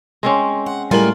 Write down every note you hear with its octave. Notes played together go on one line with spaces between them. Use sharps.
G#3 C4 C#4
F#5
A2 G3 G#3 F4 A#4 G#5 F#7